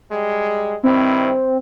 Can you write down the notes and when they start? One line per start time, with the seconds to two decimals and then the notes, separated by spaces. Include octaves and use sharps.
0.11 G3 G#3
0.83 G2 D#3 C4 E4